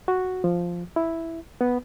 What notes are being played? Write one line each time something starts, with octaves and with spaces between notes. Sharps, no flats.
F#4
F3
E4
B3